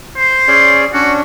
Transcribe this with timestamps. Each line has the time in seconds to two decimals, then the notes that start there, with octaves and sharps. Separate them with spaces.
0.17 C5
0.48 C#4 G#4 D5
0.94 C#4 D4 F#4